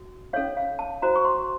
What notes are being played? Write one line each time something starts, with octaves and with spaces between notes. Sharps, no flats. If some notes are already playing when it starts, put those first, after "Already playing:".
Already playing: F#4
C#4 A4 C#5 F5
F5
A5
F#4 C5 A#5
C#6
C6